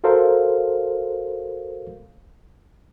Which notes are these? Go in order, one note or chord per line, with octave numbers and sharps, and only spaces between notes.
F#4 A4 A#4 C5 F5